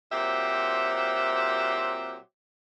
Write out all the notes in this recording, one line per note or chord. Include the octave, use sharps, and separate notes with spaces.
A#2 F#3 C4 G4 C5 E5